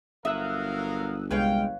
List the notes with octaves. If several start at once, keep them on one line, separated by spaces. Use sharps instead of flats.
G1 F#3 A#4 E5 F5 D#6 E6 F#6
C2 G#3 B4 C#5 F5 G5 F6